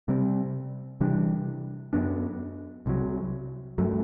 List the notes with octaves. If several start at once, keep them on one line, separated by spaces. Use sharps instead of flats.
C3 G3 C4
C3 E3 G3 D4
F#2 F#3 B3 D4
C2 C3 F#3
G2 F#3 A3